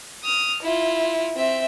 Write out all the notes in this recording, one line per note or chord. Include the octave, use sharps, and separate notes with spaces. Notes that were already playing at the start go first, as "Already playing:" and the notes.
D#6 F6
E4 F4
C4 E5